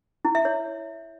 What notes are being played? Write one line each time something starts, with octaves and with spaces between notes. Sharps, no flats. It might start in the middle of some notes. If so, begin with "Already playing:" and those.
E4
E5
C#5